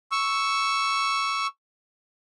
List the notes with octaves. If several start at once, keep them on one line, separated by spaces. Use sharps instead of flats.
C#6 E6